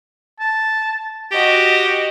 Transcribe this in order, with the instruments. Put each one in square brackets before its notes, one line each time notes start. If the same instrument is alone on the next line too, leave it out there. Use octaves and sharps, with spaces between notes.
[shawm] A5
[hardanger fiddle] F#4 D#5 [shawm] G4